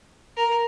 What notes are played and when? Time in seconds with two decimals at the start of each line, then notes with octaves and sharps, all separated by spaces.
0.37 A#4